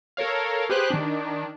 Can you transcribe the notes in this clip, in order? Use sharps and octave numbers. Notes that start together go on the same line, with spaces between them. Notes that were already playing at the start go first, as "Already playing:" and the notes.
A4 A#4 C#5 F5
G4 G#4 B4 C5 F#6
D#3 D4